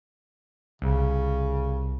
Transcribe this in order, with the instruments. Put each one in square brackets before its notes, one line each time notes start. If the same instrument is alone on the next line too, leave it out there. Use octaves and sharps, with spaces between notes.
[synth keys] C2 [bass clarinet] C#3